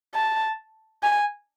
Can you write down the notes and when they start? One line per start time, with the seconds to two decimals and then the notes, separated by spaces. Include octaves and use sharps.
0.15 A5
1.03 G#5